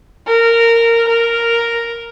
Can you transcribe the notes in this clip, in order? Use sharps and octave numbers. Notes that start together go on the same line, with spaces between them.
A#4
A#4